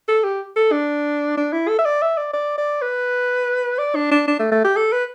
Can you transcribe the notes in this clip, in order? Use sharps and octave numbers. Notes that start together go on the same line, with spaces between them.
A4
G4
A4
D4
D4
E4
A4
E5
D5
E5
D5
D5
D5
B4
D5
D4
D4
D4
A3
A3
G4
A4
B4